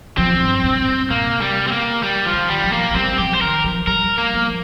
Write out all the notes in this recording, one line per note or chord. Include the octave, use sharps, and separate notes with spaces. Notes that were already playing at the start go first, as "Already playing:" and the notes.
F3 C4
G2
G2
G2
C3 A#3
G3
C4
A#3
G3
F3
D#3
G3
F3
A#3
F3
G3 C4
F3 G4
C5
D#3 A#4
F3
G3 A#4
A#3
F3